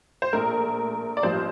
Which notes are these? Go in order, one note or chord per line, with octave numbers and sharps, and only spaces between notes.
C5
A#1 A#2 A3 A#4
D5
A1 G2 F3 C5